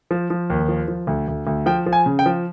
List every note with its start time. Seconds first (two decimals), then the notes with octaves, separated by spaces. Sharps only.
0.11 F3
0.30 F3
0.50 D#2
0.68 F3
0.88 F3
1.07 D2
1.28 D2
1.47 D2
1.66 F3 G5
1.86 F3
1.93 G#5
2.06 C#3
2.19 G5
2.26 F3